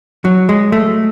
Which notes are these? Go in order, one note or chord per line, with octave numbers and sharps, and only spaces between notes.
F#3
G#3
A3